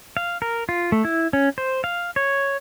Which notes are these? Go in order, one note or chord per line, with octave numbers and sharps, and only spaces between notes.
F5
A#4
F4
A3
E4
C#4
C5
F5
C#5